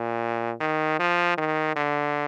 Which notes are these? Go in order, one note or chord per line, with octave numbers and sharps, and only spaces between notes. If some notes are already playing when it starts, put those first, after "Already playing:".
Already playing: A#2
D#3
F3
D#3
D3